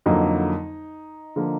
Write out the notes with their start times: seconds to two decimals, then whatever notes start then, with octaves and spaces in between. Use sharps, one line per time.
0.06 F2 D3 F#3 A#3 D#4
1.36 D3 F3 A#3